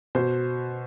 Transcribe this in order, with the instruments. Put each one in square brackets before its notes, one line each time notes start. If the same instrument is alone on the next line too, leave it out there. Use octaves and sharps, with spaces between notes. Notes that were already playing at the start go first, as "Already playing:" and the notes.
[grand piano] B2 C5